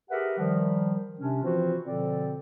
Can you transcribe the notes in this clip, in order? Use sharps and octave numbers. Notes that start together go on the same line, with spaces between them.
G4 G#4 A#4 B4 E5 F#5
D#3 F3 G3
C3 C#4 D4
E3 F3 C4 F4 F#4 C5
B2 D3 F3 C4 A4 D5